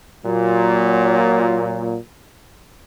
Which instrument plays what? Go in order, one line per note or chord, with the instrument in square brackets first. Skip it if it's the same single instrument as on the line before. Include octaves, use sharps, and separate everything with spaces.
[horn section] A#2 F#3